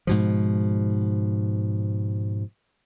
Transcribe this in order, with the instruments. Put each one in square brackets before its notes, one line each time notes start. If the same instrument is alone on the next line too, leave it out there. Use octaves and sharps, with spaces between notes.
[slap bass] G#2 B2 F3